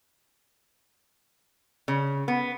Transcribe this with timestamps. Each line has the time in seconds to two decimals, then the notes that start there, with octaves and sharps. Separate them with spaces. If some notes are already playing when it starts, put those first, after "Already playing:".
1.88 C#3
2.28 B3